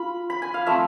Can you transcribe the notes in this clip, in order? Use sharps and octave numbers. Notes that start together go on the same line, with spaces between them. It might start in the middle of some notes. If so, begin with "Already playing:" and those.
Already playing: F4 F5 B5
B5
G#5
F5
F3 A3 C4 E5